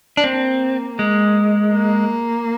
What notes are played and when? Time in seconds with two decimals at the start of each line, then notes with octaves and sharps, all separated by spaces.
0.17 D4
0.24 A#3 C4
0.99 G#3
1.74 A#3